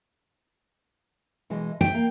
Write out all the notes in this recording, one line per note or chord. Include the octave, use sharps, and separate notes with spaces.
B2 E3 G#3
E5 G5
A#3